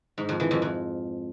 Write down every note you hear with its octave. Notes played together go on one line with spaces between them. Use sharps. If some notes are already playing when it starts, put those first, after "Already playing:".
G#2
F2
E3
F2
F2